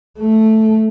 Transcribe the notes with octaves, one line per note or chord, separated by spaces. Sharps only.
A3